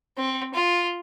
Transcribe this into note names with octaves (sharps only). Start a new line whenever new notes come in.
C4
F4